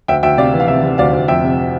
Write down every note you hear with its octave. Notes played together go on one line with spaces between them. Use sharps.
D2 E5 G5
D2 E5 G5
C3 D5 F5
E3
F5
C3 E5
C3
D2 D5 F5
D2
F2 E5 G5
C3